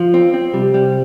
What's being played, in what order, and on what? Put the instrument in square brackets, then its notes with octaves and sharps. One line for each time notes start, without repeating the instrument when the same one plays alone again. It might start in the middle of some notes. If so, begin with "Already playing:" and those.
Already playing: [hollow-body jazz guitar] F3
C4
C4
[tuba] C3 [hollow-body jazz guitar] G3
[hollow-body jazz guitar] G3